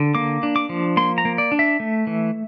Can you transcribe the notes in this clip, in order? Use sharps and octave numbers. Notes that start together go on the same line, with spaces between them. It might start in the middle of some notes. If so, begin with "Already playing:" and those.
Already playing: D3
A#3 D6
D4
D6
F3
A#3 C6
A#5
A#3
D5
D4
E5
A3
E3